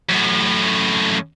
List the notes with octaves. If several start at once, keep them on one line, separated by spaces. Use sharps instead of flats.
F#2 A2